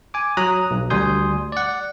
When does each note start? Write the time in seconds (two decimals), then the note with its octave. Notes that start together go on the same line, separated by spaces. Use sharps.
0.14 G#5 D6
0.37 F#3 A#5 D#6 F#6
0.71 B1
0.90 D2 G3 G#5 C6 D#6 G6
1.52 D5 F#5